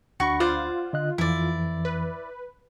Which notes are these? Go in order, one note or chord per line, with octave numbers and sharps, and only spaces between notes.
D2 D4 F#4 B5 C#6
F4 C5 D5 F#5
D3 D#5 F#6
F2 E3 E4 D5
B4